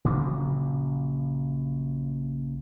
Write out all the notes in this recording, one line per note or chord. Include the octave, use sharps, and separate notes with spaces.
A#1 C#3 F3 F#3